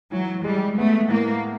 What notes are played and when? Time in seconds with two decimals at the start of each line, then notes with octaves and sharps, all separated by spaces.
0.12 E3 F#3
0.44 G3 G#3
0.77 A3 B3
1.11 A2 A#3